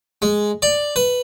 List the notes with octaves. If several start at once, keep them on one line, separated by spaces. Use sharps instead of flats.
G#3
D5
B4